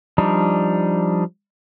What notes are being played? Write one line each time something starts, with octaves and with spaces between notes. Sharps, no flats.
F3 G3 D4 D#4